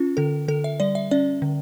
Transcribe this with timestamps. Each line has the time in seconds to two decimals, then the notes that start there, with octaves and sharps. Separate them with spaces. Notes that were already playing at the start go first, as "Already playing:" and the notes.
Already playing: C#4 F4
0.17 D3 A4
0.48 D3 A4
0.64 E5
0.80 G3 D5
0.95 E5
1.11 C#4 D5
1.42 D3